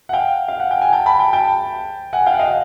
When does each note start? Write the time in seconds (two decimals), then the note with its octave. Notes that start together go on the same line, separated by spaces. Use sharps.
0.09 F#5
0.13 F5 G5
0.48 F5
0.60 F#5
0.71 G5
0.82 G#5
0.93 G5 A5
1.06 A5 B5
1.19 G5 A5
1.33 G5 A5
2.13 F#5 G#5
2.26 F5 G5
2.34 F#5
2.39 D#5 F5